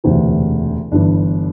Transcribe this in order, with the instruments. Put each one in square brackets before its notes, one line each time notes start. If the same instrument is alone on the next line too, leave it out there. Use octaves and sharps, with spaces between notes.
[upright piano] E1 D2 C3 E3
G1 G2 E3 D4